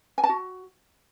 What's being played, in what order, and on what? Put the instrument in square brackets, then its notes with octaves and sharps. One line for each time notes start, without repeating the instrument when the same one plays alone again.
[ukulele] G#5
A5
F#4